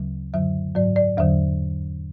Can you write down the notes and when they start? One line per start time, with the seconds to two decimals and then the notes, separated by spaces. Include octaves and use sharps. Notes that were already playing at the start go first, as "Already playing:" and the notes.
Already playing: D2 C#3 F#3
0.34 F#2 D3 F#3 E5
0.75 G#2 F#3 D5
0.96 D5
1.17 E2 D3 F#3 E5